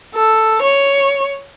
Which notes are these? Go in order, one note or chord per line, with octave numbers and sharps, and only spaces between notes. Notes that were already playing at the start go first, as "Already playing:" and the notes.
A4
C#5